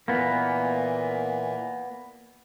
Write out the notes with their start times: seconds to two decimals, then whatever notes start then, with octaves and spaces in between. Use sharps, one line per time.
0.08 A#2 E3 A#3 B3